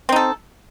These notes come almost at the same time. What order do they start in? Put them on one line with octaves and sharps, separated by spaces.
C4 D#4 A4